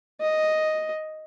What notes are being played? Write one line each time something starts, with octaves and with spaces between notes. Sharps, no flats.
D#5